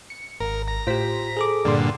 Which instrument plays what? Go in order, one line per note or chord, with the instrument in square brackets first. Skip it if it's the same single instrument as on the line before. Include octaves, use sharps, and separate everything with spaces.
[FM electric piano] C#7
[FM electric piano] G#1 [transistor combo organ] A#4
[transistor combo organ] A#5
[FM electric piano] A2 C5 B6 [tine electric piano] F4 G4
[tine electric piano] G#4 A4 D6
[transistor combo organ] G2 A#2 D3 [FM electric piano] D5 C6